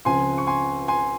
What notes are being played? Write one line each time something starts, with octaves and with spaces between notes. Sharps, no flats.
C#2 C#3 F3 C4 G#5 C6
C#6
G#5 C6
G#5 C6